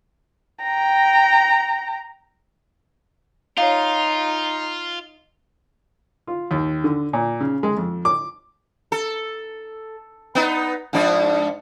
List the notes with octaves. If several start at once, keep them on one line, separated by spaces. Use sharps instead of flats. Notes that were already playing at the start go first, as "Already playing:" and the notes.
G5 A#5
D#4 F4 C#5 F5
F4
D#2
D3
A#2
C#3
G#3
F2
D6
A4
B3 D#4
G#2 F3 D4